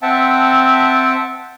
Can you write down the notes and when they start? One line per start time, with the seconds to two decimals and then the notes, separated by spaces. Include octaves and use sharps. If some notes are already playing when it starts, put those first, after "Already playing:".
0.02 C4 E5 F#5 G5 A5